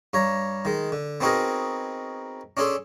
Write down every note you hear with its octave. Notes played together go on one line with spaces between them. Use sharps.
G2 C#5 A#5
D#3 G#3
D3
B3 C4 D#4 F#4 G#4 A#4
C#4 D4 G#4 A4 C6